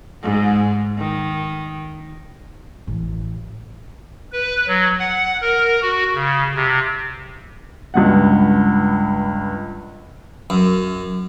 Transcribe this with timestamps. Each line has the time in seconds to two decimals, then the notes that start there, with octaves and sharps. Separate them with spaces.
0.23 G#2
0.98 D#3
2.87 A1
4.32 B4
4.67 F#3
4.99 F#5
5.41 A#4
5.82 F#4
6.14 C#3
6.55 C3
7.94 C#2 G2 F#5
10.50 F#2